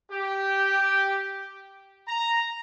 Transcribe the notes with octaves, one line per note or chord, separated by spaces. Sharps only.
G4
A#5